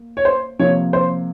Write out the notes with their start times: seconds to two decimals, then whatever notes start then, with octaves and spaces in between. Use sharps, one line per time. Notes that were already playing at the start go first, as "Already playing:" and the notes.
Already playing: A#3
0.17 C#5
0.25 C5
0.59 C3 F3 A#3 C#5
0.93 C5